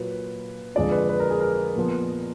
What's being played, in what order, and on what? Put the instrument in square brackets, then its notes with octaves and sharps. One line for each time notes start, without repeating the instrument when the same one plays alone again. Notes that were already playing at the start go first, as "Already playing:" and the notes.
Already playing: [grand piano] A#2 F#3 A#3 F4 B4
F2 D3 G#3 D4 F4 D5
B4
B4
A#4
G#4
A#4
A#2 F3 B3